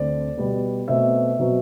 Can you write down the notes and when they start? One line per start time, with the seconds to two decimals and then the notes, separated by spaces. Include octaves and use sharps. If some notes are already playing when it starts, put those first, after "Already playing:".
Already playing: D2 D3 A3 C4 D5
0.37 B2 G3 B3
0.88 B2 A3 C4 E5
1.39 B2 F#3 C4